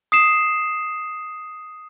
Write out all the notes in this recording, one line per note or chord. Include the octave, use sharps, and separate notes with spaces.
D#6 C7 E7